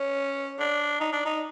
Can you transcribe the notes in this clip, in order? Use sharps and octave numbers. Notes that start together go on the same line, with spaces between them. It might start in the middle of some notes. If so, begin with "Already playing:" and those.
Already playing: C#4
D4
D#4
D4
D#4